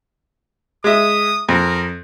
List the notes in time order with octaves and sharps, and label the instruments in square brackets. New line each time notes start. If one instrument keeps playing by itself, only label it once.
[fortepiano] G#3 E5 [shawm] D#6
[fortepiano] F2 [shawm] A#4